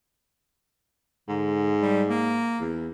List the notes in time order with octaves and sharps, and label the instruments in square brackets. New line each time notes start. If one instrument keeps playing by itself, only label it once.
[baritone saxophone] G#2 [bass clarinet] D3
[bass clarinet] G3
A#3
[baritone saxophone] E2